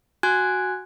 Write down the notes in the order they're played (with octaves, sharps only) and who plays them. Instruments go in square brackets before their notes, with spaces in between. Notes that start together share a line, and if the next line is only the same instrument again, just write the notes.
[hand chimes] F#4 G#5 F#6 G#6